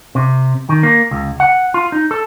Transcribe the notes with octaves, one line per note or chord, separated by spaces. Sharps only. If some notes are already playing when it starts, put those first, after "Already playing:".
C3
D#3
A#3
C#2
F#5
F4
D#4
A4